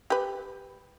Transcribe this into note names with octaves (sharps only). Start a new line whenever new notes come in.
G4 B4